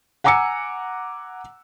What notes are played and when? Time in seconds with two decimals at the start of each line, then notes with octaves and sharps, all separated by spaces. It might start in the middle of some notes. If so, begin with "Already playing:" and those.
0.24 F#5 G#5 A#5 D6 E6 C#7